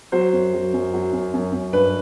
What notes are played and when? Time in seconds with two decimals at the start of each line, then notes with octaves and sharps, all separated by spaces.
0.12 F#3 C5
0.33 F#2
0.54 F#3
0.74 F#2
0.94 F#3
1.13 F#2
1.34 F#2
1.53 F#2
1.73 G2 B4